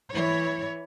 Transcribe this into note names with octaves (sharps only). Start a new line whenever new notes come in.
E3 E4 C#5